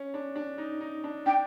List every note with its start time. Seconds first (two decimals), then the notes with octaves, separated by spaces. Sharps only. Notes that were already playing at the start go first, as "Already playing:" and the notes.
Already playing: C#4
0.14 D4
0.36 D4
0.58 D#4
0.81 D#4
1.04 D4
1.26 D4 G5